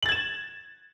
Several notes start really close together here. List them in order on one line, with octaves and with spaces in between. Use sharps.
F#7 A6 G#6 E7